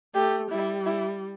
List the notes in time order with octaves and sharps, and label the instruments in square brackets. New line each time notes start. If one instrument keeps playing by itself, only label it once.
[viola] A3 [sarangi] G4
[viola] G3 [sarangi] E4
[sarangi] E4